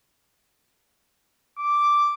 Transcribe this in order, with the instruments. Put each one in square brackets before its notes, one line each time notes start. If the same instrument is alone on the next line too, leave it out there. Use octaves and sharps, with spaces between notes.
[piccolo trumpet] D6